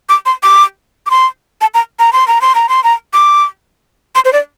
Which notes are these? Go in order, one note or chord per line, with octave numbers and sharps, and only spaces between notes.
D6
C6
D6
D6
C6
A5
A#5
A#5
C6
A#5
C6
A#5
C6
A#5
D6
C6
C5
D5